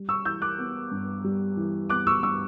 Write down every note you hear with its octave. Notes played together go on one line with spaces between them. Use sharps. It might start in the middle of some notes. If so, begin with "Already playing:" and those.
Already playing: G3
C#6 E6
E3 E6 G6
D6 F#6
B3
G2
G3
E3
B3 D6 F#6
C#6 E6
G2 C#6 E6